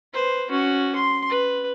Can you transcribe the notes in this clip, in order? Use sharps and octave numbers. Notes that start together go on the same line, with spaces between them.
B4 C5
C#4 F#4
C6
B4